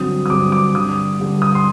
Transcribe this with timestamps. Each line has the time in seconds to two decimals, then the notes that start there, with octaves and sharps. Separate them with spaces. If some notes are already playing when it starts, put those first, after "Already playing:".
Already playing: G2 D3 F#3 C4 D#6
0.26 D#6
0.30 G2 D3 F#3 C4 D6
0.52 D6
0.75 G2 D3 G3 D#6
1.20 G2 D3 G3
1.42 D#6
1.55 C6